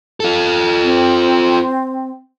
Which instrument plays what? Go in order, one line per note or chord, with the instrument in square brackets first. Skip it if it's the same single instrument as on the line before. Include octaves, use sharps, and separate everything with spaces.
[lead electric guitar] F4 A4
[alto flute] C4